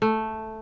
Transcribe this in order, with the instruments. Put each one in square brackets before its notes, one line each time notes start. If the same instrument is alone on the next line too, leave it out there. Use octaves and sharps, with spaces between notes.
[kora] A3